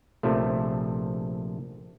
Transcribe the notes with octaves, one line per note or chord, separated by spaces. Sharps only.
A#1 C3 F3 A3